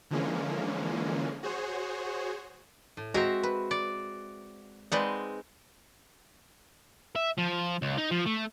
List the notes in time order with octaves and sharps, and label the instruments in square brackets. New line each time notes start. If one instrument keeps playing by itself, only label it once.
[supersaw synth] D3 E3 F3 G#3 A#3 C#4
F#4 G#4 C5 C#5
[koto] A2
[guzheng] G#3 [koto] C4 E5 A#5 [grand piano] F#4
[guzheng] B4
[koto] D5
[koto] G#3 C4 D#4 [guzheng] B4 D5 F#5
[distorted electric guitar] E5
F3
C#2
D#4
F3
A3